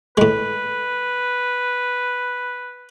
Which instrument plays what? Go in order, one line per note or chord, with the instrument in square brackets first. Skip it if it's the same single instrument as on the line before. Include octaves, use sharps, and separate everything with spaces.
[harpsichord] A2 G#3 [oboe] B4